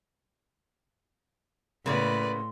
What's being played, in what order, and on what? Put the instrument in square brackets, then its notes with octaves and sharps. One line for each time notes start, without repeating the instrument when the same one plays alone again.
[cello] A2 [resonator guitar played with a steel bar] C#3 A#3 B3 [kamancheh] B4 D5 [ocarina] C6